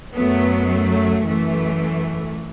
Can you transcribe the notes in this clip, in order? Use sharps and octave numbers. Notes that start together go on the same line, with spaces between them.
F#2 F#3 A3 B3
A3
F#2 E3 A3